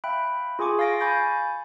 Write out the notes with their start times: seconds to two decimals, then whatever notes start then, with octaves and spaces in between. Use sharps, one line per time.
0.04 E5 F5 G5 B5 F#6
0.59 F4 G#4 G#5 C#6 D6
0.79 F5 A6 A#6 D7
1.01 G#5 B5 C#6 G6 A6